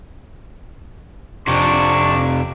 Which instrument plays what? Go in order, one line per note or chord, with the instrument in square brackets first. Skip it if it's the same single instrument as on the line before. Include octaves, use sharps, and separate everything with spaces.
[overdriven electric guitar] F2 C3 [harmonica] D4 C#6 D6